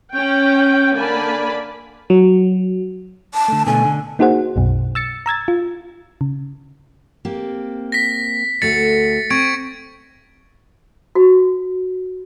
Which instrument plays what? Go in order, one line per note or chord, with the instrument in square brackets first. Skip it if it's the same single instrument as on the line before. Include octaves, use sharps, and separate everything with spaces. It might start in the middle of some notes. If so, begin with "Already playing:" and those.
[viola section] C#4 G5
D3 A#3 D5 G#5 A5 B5
[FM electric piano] F#3
[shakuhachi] A5
[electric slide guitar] D3 A3
[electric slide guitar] B2 D3 A3 [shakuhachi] G#5
[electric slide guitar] D3
[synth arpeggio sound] A#3 D#4 F#4 G#4 C5 F#5
B1 F#2 B2
E6 A6 C#7
A#5 E6 G#6 A6
F4
C#3
[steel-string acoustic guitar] A#3 C4 G4
[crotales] A#6 B6
[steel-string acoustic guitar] D2 A3 F#4 [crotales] A6 C#7
[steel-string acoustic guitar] C4 [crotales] C#6 G#6 D7
[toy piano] F#4